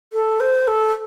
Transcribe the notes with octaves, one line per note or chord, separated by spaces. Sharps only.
A4
C5
A4